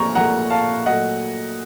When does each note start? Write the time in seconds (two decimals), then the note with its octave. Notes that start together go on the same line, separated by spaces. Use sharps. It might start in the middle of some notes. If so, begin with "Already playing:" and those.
Already playing: A#2 F3 A3 A#5 C#6
0.15 A#2 F3 A3 F#5 A#5
0.50 F5 A5
0.86 A#2 F#3 A3 D#5 F#5